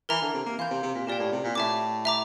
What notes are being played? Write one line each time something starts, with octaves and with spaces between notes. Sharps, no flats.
E3 A#4 E5 A#5
D3
C3
A#3
E3 F5 C6 G6
C3
C3
A#2
A#2 G4 A#4 D5 G5
A2
C3
A#2
A2 E5 A5 D6
E5 A#5 D6